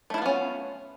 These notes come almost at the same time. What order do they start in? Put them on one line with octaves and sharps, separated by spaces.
A3 E4 F4 B3 C#4